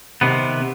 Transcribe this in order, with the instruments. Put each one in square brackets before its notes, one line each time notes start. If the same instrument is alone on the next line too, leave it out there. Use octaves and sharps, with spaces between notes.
[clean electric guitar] C3 D#3 B3